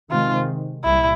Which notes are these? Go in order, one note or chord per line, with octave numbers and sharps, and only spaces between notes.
C3 D#3 G#3 C4 F4
C2 A#2 G3 E4